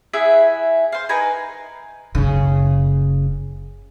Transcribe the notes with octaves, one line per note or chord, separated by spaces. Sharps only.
E4 G#4 E5 F#5
C5 F5
D#4 A#4 B4 G#5
F#1 C#3